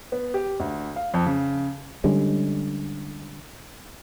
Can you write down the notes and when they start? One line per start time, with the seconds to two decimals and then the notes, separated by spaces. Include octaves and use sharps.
0.12 B3
0.34 G4
0.60 D2
0.96 F5
1.14 F2
1.26 C#3
2.04 D3 G3 G#3 C#4